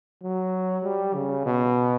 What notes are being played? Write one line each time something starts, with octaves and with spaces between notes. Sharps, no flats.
F#3
G3
C#3
B2